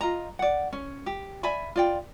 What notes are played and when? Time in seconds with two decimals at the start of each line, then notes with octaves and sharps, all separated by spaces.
0.01 F4 D#5 A#5
0.39 D5 F#5
0.73 C#4
1.06 G4
1.43 D5 E5 G#5 B5
1.76 F4 D5 G5